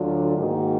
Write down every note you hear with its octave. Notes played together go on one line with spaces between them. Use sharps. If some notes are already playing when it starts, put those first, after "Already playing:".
Already playing: D2 D3 F#3 D4 F4
G#2 D#3 A#3 D#4 F#4